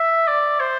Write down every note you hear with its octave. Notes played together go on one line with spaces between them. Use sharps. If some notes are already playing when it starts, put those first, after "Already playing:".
Already playing: E5
D5
C5